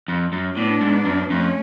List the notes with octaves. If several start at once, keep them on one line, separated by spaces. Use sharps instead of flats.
F2
F#2
A2 B3 D4
G#2
F#2
F2 A3 C#4